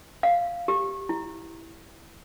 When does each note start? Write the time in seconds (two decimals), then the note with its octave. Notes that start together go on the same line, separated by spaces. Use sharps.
0.23 F5
0.68 G4
1.09 E4